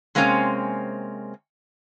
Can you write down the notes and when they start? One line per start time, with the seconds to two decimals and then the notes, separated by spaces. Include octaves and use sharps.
0.15 C3 G#3 A#3 C4 C#4